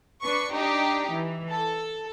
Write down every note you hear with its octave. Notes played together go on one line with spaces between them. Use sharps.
D4 B4 C#6
D4 D#4 G4
E3
A4